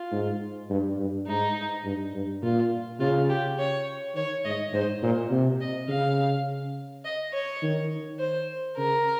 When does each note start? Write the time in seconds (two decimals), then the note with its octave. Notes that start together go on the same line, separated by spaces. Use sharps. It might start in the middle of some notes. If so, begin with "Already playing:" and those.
Already playing: F4
0.12 G#2
0.70 G2
0.98 G2
1.28 G#2 D#4
1.85 G2
2.14 G2
2.42 A#2 F4
3.00 C#3 F4
3.29 G4
3.59 C#5
4.15 D#3 C#5
4.45 G#2 D#5
4.73 G#2 C5
5.02 A#2 C5
5.31 C3
5.61 D#5
5.89 C#3 F5
7.05 D#5
7.33 C#5
7.63 D#3
8.19 C5
8.77 C#3 A#4